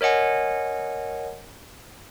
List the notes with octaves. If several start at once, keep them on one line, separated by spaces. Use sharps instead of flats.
A#4 C#5 D#5 F#5 G#5